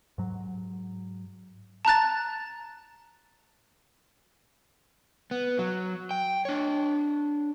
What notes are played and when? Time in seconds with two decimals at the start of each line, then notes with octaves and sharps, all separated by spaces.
0.18 G#2 F#3
1.85 A5 A#5 F#6 A6
5.31 B3
5.59 F#3
6.11 G5
6.45 D4 C#5